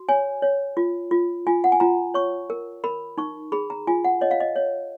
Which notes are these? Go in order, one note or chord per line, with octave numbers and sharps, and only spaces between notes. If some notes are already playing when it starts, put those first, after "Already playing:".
Already playing: F#4
C#5 G#5
C#5
F4
F4
F4 G#5
F#5
G#5
F4 A#5
C#5 C#6
A#4
A#4 B5
D#4 C#6
G#4 B5
A#5
F4 G#5
F#5
C#5 D#5
F5
D#5
C#5